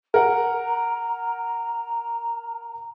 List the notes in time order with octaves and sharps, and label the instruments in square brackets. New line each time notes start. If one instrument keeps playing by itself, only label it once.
[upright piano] A#4 F#5 [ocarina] A#5